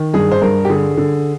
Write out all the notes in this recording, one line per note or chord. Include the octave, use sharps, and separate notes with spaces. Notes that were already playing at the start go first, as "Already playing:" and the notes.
Already playing: D#3
G2 G#4
C5
G2 A#4
G4
D3 G#4
D3